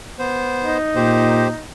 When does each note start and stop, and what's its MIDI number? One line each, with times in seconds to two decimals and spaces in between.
0.19 0.78 59
0.19 0.78 72
0.62 1.66 63
0.96 1.51 46
0.96 1.48 67
0.96 1.48 72